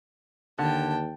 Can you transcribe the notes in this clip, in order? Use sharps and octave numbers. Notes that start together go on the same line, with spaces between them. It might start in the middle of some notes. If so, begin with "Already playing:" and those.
D#2 D3 G5 A5